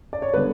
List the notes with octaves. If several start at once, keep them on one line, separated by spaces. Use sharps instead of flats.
D5
C#5
D3 G3 B3 B4